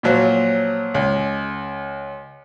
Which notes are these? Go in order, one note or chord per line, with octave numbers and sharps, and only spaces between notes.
A#2 F3 F#3
C#2